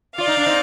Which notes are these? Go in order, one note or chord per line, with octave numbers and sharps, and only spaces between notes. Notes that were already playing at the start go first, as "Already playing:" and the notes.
F4 D5 F5
D#4
D4
C4 D#4